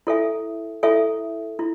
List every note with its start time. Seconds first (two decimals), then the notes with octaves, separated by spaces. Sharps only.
0.07 E4 A4 C#5 E5 G#5
0.83 E4 A4 C#5 E5 G#5
1.59 E4